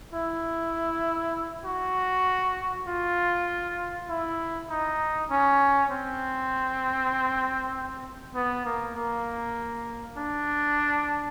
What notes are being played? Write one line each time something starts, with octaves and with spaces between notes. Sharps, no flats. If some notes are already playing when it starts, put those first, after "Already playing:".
E4
F#4
F4
E4
D#4
C#4
C4
B3
A#3
A#3
D4